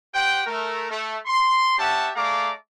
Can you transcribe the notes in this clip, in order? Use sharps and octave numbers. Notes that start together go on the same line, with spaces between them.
G4 C5 F#5 G5
A3 A#4
A3
C6
C#4 G4 E5 F#5 A5
A3 G#4 D5 F5 A#5 D6